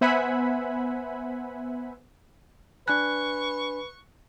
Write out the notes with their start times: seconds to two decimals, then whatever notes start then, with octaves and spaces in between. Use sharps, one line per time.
0.01 B3 C5 E5 F#5 G#5 B5
2.88 D4 B4 G#5 B5 C#6 F#6